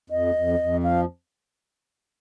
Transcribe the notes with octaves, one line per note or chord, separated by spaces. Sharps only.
F2 D#5
F2
F2
F3 F5